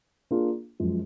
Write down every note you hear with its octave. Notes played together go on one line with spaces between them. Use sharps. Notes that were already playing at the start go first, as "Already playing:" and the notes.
A#3 D4 F4 G#4
F#2 F3 G#3